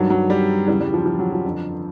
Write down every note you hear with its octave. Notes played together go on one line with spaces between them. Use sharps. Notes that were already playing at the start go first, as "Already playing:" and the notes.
Already playing: G2 D#3 F#3
F#3
G3
E2 C#3 E3 G3
G3
F3
F3
F#3
F3
F2 D3